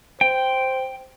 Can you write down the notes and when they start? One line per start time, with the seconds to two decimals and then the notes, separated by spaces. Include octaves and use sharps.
0.21 C5 G5